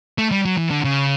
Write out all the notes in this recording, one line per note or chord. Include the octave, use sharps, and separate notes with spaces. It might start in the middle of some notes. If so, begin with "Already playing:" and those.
A3
G3
F#3
E3
D3
C#3